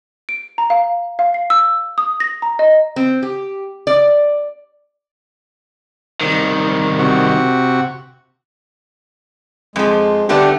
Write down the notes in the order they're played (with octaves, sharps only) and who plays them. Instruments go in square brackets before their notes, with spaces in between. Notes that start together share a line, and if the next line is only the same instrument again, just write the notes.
[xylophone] D7
A#5
F5
F5
C7
E6
D#6
A#6
A#5
D#5
[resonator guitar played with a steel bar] C4
G4
D5
[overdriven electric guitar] C2 D#3
[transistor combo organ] C3 F#4
[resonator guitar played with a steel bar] F2 F3 [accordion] G#3
[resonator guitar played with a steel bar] D3 A3 B3 [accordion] D4 G4